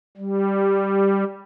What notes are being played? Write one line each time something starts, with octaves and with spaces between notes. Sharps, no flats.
G3